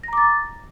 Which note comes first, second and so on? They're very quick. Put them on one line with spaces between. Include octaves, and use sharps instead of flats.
A#6 A#5 D6 A6